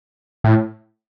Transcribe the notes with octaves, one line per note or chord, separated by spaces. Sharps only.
A2